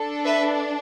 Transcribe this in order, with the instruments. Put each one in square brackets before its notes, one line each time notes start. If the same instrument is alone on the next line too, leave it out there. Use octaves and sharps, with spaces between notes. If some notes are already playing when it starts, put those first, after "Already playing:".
Already playing: [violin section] D4 A4
B4 E5